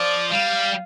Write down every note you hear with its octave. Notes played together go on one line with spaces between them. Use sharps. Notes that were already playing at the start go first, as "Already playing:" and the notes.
Already playing: F3 D5
G3 F5